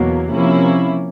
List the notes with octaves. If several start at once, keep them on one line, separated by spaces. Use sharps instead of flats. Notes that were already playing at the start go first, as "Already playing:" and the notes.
Already playing: E2 B2 F#3 A#3
C3 F3 A#3 C#4 E4